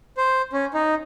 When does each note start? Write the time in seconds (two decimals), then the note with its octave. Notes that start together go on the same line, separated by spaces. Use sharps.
0.17 C5
0.53 C#4
0.74 D#4